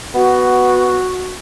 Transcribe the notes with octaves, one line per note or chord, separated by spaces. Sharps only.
B3 F#4